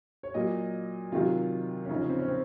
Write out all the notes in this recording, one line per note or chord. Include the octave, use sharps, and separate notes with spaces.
C#5
A#2 F#3 D#5
C3 D#3 F#3 F4
C#4
C#3 F3 D#4
C#4
C4
C#4
C4